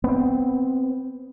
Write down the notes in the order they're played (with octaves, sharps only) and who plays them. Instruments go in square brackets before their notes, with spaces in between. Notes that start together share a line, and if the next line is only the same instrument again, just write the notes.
[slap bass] B3 C4